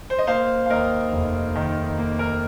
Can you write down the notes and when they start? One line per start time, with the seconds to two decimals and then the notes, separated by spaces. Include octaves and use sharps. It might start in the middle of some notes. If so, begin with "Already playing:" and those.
0.10 C5
0.19 D#5
0.27 A#3 C5 F5
0.66 F5
0.70 D#2 A#4 D#5
1.12 F1
1.55 D#3
1.98 A#3
2.19 A#4